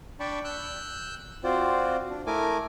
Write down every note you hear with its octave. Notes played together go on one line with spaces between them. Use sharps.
D4 D5 G5 A5 B5 C#6
E6 F#6 G6
C4 F4 F#4 C5 D5
D4
A3 E4 A#4 G#5 D6